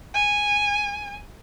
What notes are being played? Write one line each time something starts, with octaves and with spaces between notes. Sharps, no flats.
G#5